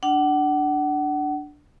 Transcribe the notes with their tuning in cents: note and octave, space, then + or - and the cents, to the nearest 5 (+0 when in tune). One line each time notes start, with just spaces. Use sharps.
D4 +0 F#5 +30